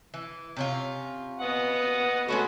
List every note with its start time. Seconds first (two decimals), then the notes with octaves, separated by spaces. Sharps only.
0.14 E3
0.57 C3 C#4 F4
1.40 B3 D#5 F#5
2.28 G#3 A3 C#4 F#4 B4